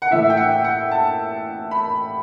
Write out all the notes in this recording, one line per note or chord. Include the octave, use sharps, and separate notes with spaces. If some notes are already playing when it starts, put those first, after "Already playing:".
F#5
A2 E3 E5
G5
F#5
F#5
A5
B5